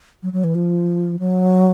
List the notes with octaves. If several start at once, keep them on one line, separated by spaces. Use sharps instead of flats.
F#3
F#3
E3
F3
F#3